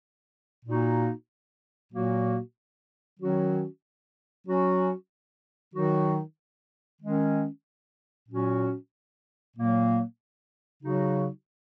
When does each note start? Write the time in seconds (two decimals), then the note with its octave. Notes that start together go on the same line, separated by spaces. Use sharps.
0.66 A#2 A#3 D#4 F#4
1.92 A#2 F#3 A#3 F#4
3.20 D#3 F#3 C#4 F#4
4.47 F#3 C#4 F#4
5.74 D#3 F#3 D#4 F#4
7.02 D#3 G#3 C#4
8.29 A#2 F#3 C#4 F#4
9.56 A#2 F#3 A#3
10.83 C#3 F#3 D#4 F#4